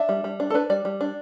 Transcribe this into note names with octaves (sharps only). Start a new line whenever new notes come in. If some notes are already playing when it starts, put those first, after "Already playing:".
Already playing: D4 E5
G3
G3
D4
A4
D4 B4
G3 D5
G3
D4